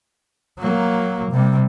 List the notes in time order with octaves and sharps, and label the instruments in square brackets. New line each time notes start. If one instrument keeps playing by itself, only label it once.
[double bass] F#3 A#3
C3 G3